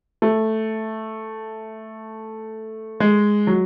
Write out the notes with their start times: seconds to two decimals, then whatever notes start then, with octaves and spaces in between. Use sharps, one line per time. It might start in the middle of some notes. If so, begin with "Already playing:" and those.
0.22 A3
3.00 G#3
3.47 F#3